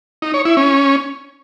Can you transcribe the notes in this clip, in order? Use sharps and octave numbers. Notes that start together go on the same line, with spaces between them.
D#4
C#5
E4
C#4